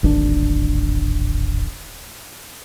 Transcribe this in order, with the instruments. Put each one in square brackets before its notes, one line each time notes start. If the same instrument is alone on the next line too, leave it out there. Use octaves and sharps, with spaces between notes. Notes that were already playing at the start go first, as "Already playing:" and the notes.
[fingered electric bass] D1 G#1 C4 D4